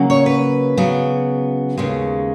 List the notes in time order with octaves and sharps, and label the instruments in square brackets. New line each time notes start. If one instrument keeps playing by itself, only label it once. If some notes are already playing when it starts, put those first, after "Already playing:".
Already playing: [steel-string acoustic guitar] C#3 F#3 A#3 C#4
C#5
B4
C#3 F#3 B3
D#2 C#3 G#3 C#4